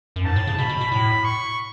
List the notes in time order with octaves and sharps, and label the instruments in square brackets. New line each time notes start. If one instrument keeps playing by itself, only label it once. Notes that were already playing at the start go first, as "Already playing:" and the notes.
[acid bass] F#2
[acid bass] G#2 [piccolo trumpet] A5
[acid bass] A2
C#3
[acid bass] B2 [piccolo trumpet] B5
[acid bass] B2
B2
[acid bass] A2 [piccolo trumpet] B5
[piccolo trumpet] C#6